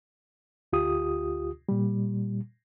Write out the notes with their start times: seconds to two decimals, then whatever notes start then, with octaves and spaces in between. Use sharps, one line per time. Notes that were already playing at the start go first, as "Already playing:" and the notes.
0.73 D2 F4 G4 D#6
1.69 A#2 G3